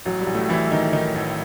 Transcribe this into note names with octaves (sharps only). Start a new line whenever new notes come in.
A1 F#3
G3
A1
A2 A3
A1 E3 E4
D#3 D#4
D#3 D#4
A1